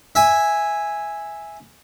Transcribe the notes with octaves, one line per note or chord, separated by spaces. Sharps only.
E5 G#5